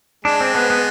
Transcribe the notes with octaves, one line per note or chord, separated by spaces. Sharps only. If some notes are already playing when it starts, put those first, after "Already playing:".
G#3 D4
C4
B3
B3